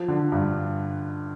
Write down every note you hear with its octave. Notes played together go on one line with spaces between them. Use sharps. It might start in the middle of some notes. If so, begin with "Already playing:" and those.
Already playing: F3
D3
G2